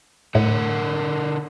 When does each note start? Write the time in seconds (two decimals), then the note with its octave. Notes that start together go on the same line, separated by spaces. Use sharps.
0.35 A2 D3 A#4 F#5